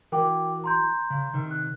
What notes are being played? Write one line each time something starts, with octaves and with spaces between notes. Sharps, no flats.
E3 F#4 A#4 G5 D6
A#5 C6 G6
C#3
C3 D#3
F#6